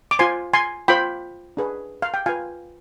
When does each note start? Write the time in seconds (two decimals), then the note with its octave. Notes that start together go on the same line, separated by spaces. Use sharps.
0.11 D6
0.19 F4 C5 G#5 C6
0.53 G#5 C6
0.88 F4 C5 G5 B5
1.57 D4 G#4 B4
2.02 F5
2.14 G5
2.26 F4 B4 F5 G#5